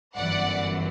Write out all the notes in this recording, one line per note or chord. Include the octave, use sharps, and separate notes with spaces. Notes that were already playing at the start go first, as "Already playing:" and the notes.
G1 F#2 E3 D5 F#5